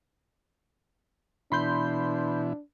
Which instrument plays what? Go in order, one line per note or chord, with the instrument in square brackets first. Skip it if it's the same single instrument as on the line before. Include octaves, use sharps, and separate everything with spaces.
[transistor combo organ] B2 E3 E4 [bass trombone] D4 [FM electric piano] B5 C6 G6